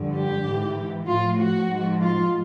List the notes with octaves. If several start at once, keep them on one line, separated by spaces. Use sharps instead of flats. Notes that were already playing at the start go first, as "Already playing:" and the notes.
Already playing: G2 D3 F3
G4
G#2 E3
A2 F3 F4
F#4
G#2 F3
F4